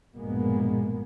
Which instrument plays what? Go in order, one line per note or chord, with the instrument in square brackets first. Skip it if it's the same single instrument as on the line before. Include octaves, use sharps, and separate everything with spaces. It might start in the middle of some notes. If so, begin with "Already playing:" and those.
[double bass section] A#1 G2 B2 G#3 A#3 B3